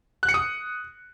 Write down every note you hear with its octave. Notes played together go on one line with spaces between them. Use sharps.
F#6
C#7
D#6